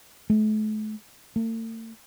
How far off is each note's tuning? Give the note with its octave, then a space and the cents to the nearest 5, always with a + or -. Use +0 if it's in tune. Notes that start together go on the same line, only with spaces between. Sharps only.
A3 -40
A3 +45